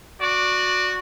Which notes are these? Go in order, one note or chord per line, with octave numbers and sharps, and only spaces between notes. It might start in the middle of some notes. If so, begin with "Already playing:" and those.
F#4 D5